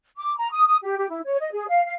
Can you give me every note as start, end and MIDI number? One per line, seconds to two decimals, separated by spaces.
0.17 0.33 86
0.37 0.51 82
0.52 0.64 87
0.67 0.77 87
0.83 0.95 67
0.98 1.08 67
1.09 1.20 64
1.25 1.37 73
1.39 1.51 75
1.52 1.67 68
1.68 1.83 77
1.85 1.95 77